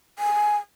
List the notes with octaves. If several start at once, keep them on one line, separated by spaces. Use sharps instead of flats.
G#5